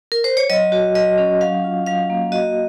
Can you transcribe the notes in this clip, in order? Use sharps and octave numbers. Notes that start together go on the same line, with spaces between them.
A#4
C5
C#5
F#3 D#5
F#4
F#3 D#5
C#4
F#3 F5
F4
F#3 F5
A#3
F#4 D#5